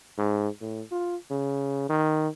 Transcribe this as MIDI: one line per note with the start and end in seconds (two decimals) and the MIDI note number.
0.18 0.49 44
0.61 0.82 45
0.91 1.16 65
1.31 1.86 49
1.89 2.28 51